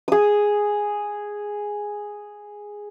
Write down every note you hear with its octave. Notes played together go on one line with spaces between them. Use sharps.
G#4 D#6